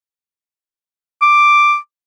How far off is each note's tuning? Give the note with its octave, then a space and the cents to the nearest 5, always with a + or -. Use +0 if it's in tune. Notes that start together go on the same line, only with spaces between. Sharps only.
D6 +5